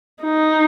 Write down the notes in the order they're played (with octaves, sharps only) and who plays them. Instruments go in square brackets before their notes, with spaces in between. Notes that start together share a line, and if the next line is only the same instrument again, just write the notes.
[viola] D#4